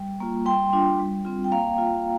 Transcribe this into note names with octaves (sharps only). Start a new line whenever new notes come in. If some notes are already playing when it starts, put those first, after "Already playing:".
Already playing: G3
A#3 F4
G3 G5 C6
D4 F4
G3
C4 F4
G5
A#3 F5 A#5
F4